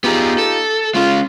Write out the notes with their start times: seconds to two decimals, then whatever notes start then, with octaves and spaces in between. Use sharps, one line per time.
0.04 B3 D#4 F4 G4 G#4
0.38 A4
0.95 G#3 C#4 F4